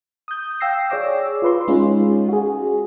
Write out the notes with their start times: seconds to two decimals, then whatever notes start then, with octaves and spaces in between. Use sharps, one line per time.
0.28 D#6 G6
0.60 F5 G5 E6 A#6 C7
0.90 G#4 C#5 D5 D6 E6
1.42 F4 B4 C6
1.68 G#3 C#4 D#4 F4 G#4
2.29 F#4 G#4